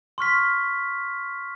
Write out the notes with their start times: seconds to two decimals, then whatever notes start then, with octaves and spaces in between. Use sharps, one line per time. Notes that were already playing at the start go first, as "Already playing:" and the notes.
0.18 C6 C#6 F6 B6